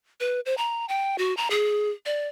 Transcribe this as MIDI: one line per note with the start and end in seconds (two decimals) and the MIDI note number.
0.20 0.40 71
0.46 0.55 72
0.58 0.86 82
0.89 1.18 79
1.18 1.36 66
1.37 1.48 82
1.50 1.90 68
2.06 2.28 74